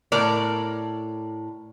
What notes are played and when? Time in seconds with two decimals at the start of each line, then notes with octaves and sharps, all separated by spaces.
0.12 A2 A#4 D5